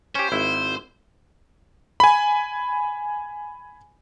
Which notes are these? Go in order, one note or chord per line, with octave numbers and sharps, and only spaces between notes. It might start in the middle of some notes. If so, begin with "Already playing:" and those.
C#4 G4 C5
G#1 E4
G#5 B5